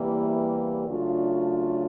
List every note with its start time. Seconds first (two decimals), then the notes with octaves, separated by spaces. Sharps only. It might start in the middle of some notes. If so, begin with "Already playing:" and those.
Already playing: E2 C3 E3 G3 A#3
0.87 C#3 F#3 A3 D4 F4